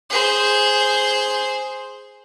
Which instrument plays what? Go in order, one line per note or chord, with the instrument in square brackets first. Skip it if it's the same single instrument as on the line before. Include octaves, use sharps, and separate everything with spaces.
[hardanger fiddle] G#4 C5